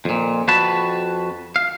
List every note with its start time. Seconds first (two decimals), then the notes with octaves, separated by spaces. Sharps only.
0.05 F2 A#2
0.48 F2 F#4 B4 A5 B5
1.56 F5